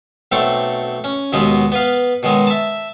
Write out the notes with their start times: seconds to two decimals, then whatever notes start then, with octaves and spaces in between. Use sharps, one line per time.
0.32 B1 F#3 A3 C4 A4 D6
1.04 C#4
1.33 D#2 B2 F#3 G#3 B3
1.72 B3 B4 F5
2.23 B2 D#3 F#3 G#3
2.47 E5 A5